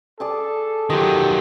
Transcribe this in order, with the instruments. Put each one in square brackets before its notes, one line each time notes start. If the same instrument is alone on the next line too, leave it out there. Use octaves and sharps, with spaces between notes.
[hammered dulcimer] G#4 D5 A5 [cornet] A4
[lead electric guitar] D#3 F#3 [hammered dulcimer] F4 D#5 [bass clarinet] G4